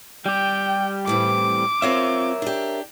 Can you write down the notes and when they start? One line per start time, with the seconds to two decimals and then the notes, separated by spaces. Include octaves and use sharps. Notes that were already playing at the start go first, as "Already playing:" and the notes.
0.26 G3 G4 G5
1.07 A2 E3 C4 D6
1.82 C4 F4 A#4 C#5 E5 F5
2.42 D4 G4